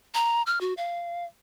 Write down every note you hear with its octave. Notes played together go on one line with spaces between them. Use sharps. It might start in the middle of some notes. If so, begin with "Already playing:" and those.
A#5
F6
F#4
F5